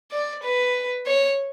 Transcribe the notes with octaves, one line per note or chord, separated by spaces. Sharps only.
D5
B4
C#5